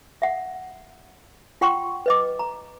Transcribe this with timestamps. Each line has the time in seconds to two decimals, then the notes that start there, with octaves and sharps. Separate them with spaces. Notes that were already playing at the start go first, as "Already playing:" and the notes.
0.22 E5 F#5
1.61 F4 F#5 G5 C6 C#6
2.06 B4 D#5 D6
2.39 A#5